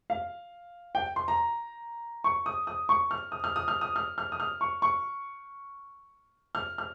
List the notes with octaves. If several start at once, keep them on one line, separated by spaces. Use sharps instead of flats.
F5
G5
C6
A#5
C#6
D#6
D#6
C#6
F6
D#6
F6
D#6
F6
D#6
F6
F6
D#6
F6
C#6
C#6
F6
F6